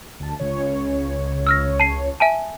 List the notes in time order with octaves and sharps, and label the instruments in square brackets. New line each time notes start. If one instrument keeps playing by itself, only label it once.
[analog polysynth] D2 A5
C#2 C#3 C#5
[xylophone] E6 F6 A#6
A5 C7
E5 G#5 A5